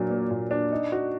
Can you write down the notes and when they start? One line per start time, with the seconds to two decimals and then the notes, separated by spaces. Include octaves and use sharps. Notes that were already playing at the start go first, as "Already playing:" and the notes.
Already playing: A#2 F#3 A#3 D4
0.10 A#3
0.31 A#2
0.51 D4
0.72 D#4
0.92 F#4